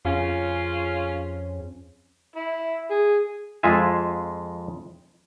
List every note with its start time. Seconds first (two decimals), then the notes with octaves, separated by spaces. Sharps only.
0.05 F2 C#3 C#4 F4
2.36 E4
2.91 G#4
3.63 F2 G#3 F4 E5 G#5